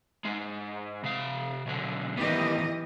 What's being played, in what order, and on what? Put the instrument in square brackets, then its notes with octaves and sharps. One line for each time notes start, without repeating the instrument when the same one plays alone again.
[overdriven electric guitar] G#2 G#3
C3 F5
B1 D3
[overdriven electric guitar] B2 D#3 [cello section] E3 G4 D#5